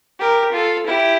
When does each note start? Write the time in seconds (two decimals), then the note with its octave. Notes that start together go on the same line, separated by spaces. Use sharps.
0.20 G4 A#4
0.53 F4 A4
0.88 E4 G4